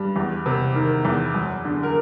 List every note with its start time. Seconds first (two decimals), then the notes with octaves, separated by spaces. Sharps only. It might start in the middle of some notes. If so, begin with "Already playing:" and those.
Already playing: G2 G3
0.16 E2
0.46 C3
0.75 D#3 A#4
1.05 E2
1.34 F#2
1.65 D3
1.83 A#4